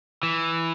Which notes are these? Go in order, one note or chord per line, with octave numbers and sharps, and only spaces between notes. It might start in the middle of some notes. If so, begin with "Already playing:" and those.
E3